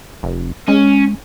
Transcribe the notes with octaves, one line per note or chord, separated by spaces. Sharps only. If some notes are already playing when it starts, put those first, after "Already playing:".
F1
G#3 C#4